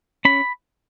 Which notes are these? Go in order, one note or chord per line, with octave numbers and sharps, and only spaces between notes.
C#4 B5